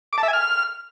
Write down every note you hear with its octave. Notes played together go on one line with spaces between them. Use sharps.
D6
A5
E5
G#5
F6